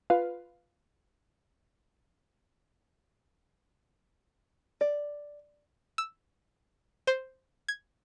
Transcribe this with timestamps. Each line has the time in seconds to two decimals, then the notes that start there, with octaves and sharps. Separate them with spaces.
0.10 F4 B4 F5
4.81 D5
5.98 E6
7.07 C5
7.68 G#6